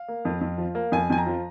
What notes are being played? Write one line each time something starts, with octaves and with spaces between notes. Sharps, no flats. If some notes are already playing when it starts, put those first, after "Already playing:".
Already playing: F5
A#3
F2
F2
F3
A#3
F2 G#5
F2 G#5
A#5
F3